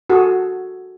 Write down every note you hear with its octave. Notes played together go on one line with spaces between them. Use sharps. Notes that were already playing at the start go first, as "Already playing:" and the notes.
F#4 G#4 A4